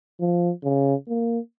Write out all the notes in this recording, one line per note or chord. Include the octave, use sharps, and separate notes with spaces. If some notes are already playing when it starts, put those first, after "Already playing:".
F3
C#3
A#3